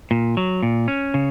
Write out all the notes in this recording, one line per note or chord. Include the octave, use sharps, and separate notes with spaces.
A#2
F#3
A#2
C#4
C#3